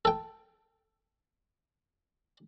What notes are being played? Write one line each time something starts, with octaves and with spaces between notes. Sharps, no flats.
A4 G5